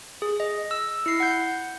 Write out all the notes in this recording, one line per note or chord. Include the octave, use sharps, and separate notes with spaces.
G#4
D#5
E6
E4 C7
F#5 G6